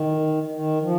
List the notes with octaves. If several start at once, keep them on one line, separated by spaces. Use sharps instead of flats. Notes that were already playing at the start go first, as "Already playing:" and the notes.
Already playing: D#3
D#3
F3